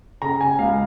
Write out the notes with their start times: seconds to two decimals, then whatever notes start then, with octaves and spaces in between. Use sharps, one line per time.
0.22 C#3 A#5
0.41 G#5
0.59 C#2 F5